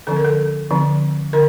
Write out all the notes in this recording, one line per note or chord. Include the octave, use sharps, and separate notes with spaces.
D3 F3 C4 A4
A#4
A4
D3 F3 C4
D3 A#4